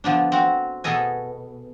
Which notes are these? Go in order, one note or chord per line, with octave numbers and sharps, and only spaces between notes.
D3 F3 B3 D4
C4 F#4
B2 B3 G#4 A4 D#5 G#5